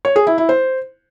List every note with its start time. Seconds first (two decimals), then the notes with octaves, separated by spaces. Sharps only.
0.05 C#5
0.16 G#4
0.27 E4
0.38 E4
0.49 C5